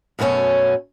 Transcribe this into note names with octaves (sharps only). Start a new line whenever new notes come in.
F#2 B2 A3 C4 C#4